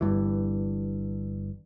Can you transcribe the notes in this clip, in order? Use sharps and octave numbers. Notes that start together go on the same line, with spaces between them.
G1 G2 E3